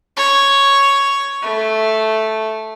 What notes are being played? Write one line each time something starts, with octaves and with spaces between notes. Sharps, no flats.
C#5
A3